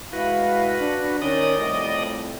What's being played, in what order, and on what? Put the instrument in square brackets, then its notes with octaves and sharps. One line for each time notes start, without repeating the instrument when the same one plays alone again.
[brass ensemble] G#3 E4 F5 [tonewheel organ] F#4 B4
[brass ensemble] D4
[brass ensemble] D#3 C#4 [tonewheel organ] D5 D#5 D#6
[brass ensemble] C2 F2 A2